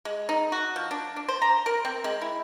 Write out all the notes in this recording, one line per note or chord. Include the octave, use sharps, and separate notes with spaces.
G#3
D#4
F#4
F3
D4
D4
C5
A#5
A#4
C4
G#3
E4